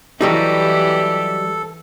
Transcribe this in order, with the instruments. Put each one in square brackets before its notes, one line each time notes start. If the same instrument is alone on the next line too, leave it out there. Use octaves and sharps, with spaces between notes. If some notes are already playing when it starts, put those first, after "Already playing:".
[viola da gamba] E3 E4 G4 [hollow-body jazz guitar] F#3 G3 D#4 [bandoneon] A4